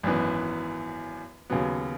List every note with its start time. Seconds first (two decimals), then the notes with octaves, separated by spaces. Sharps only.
0.03 G#1 F#2 E3 B3
1.50 D#2 C#3 F#3 B3